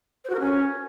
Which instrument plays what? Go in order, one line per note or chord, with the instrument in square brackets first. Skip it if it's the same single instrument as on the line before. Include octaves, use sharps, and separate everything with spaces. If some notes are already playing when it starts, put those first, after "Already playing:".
[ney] C5
F#4
A#4
C#4